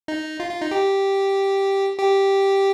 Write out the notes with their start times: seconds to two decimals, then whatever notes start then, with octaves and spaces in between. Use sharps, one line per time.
0.08 D#4
0.40 F4
0.50 F4
0.61 D#4
0.71 G4
1.98 G4